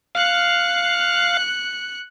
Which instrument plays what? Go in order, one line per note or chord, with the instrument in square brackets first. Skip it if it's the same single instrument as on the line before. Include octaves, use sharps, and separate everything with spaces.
[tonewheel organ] F5 [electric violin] F#6 C#7